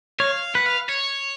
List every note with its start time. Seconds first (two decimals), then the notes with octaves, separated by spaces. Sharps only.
0.20 C#5 F5
0.55 B4 F#5
0.66 F5
0.89 C#5